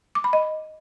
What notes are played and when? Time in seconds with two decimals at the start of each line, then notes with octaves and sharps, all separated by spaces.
0.15 D6
0.24 B5
0.33 D#5